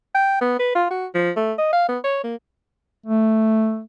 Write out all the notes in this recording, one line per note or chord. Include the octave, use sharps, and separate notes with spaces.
G5
B3
B4
F4
F#4
F3
A3
D#5
F5
B3
C#5
A#3
A3